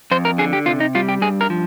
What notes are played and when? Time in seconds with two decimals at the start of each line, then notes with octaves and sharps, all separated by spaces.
0.11 F2 C5
0.25 A#4
0.38 D3 G#4
0.53 G4
0.66 C3 F4
0.80 D#4
0.95 G3 F4
1.09 G4
1.21 G2 G#4
1.41 A#4
1.50 F3